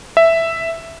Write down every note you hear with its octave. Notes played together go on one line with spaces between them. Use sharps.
E5